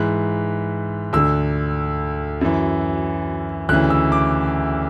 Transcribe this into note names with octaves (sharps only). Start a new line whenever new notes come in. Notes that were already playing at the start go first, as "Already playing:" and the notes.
Already playing: G#2 E3 F#6
D2 D3 E6
F#2 E3
D2 C#3 E3 F#6
E6
D6